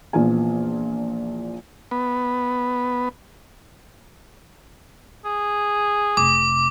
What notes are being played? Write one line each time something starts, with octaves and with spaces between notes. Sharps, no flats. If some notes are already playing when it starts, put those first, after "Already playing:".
A#1 A#2 E3 B3 F4 G#5
B3
G#4
F1 C3 D6